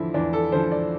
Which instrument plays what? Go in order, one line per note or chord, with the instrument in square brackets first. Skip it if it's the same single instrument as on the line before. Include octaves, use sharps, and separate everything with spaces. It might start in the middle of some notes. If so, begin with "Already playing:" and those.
Already playing: [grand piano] E2 D3 F3 E4
E2 D4
A4
D3 C5
F3
D5